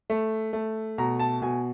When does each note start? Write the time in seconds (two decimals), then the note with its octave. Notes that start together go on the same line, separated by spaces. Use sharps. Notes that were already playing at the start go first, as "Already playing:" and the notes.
0.10 A3
0.53 A3
0.98 B2 A#5
1.20 A5
1.42 B2 G#5